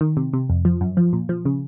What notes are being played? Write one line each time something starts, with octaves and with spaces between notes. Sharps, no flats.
D#3
C3
C3
F2
F3
F#2
F3
A#2
F3
C#3